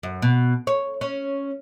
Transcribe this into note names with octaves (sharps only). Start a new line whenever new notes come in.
F#2
B2
C#5
C#4